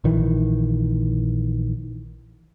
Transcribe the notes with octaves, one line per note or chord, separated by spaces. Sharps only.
A#1 D#3 E3